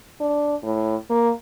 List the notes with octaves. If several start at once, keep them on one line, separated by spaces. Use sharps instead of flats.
D4
A2
A#3